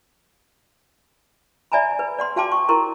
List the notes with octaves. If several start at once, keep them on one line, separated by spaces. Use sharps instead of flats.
D5 E5 G#5 A#5 B5
B4
D5 F#5 C6
F#4 F5 G5 A5 C6 D6
C#6
E4 A#4 A#5 C6 C#6